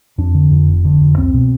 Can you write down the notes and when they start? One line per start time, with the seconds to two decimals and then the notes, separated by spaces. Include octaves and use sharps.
0.18 F2 D4
0.34 D3
0.51 F2
0.67 F1
0.85 D3
1.01 F2
1.17 C2 C4
1.34 B2